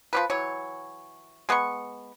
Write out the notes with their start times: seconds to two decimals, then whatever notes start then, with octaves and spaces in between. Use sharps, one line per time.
0.13 F3 G3 B4
0.30 E3 F#3 C#5
1.49 G#3 B3 A#4 C#6